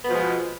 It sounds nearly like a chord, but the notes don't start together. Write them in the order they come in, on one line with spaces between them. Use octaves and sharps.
B3 B2 F3 G#3